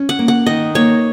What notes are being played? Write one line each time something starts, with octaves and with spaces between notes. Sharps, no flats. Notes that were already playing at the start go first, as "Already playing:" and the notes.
Already playing: C#4
F#5
A#3
F#5
D#3 D#5
A#3 C#5